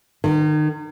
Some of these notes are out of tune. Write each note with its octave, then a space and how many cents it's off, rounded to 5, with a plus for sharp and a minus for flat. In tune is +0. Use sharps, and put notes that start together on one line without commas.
D#3 -35